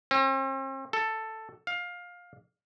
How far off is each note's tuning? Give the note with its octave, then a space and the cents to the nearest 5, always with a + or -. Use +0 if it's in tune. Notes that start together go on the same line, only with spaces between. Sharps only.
C4 +45
A4 +5
F5 +20